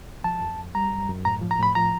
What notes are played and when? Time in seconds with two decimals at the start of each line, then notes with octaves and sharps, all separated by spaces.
0.09 C2
0.24 F3 A5
0.41 F2
0.58 F2
0.75 G3 A#5
0.92 F#2
1.09 F#2
1.25 A2 A#5
1.41 F3
1.51 A#5
1.59 A2 B5
1.75 F3 A#5